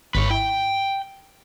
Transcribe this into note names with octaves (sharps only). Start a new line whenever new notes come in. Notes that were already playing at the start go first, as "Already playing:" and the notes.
G#1 G#2 B4 C#5
E4 G5